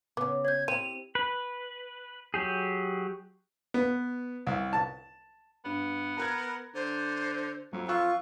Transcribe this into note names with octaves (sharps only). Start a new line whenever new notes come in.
C#3 B3 C#4 D6
C#5 G6 G#6
C4 E4 F4 G4 D#7 F7
B4
F#3 G4 G#4
B3
C2
A5
G2 B3
A#4 A#5 F#6 G#6
D3 C5
F2 F#3
F4 C6 C#6 E6 F#6